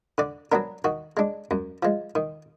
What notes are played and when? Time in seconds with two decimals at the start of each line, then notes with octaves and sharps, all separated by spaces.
0.18 D3 D5
0.52 F#3 B3 D4 A#4
0.84 D#3 F#4
1.17 G#3 D4
1.51 F#2
1.83 F3 G#3
2.15 D#3